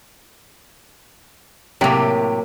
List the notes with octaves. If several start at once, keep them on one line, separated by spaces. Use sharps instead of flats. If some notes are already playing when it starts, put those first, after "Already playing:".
A2 C3 F#3 A#3 G4